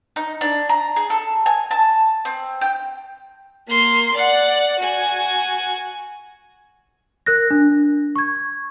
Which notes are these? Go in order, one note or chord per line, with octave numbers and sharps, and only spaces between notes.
D#4
D4
A#5
G#4
A4
G#5
A5
C4
G5
A#3 C6
D5 F#5
F#4 G#5
A#4 F#6 A#6
D4
C#6 G#6